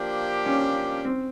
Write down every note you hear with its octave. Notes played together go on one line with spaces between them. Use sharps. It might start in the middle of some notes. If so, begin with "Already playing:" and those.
Already playing: F3 A#3 D4 G4
C#4
C4